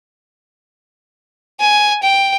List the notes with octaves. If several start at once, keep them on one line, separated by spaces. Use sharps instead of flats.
G#5
G5